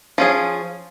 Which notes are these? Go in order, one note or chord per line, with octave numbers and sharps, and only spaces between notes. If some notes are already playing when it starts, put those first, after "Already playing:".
F3 C#4 G#4